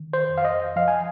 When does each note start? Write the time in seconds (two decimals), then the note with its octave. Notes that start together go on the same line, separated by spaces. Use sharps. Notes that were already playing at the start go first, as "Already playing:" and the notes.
Already playing: D#3
0.13 C5
0.29 F2
0.38 F5
0.45 D#5
0.76 F3 F5
0.88 G#5